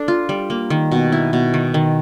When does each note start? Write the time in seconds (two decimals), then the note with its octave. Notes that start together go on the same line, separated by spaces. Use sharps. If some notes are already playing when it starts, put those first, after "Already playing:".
Already playing: D4 A4
0.08 F4
0.29 G3
0.50 A#3
0.70 D#3
0.92 B2
1.12 E4
1.33 B2
1.54 D#3
1.74 D#3